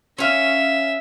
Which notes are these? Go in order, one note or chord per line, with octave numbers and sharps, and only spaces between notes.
C#4 E5 F5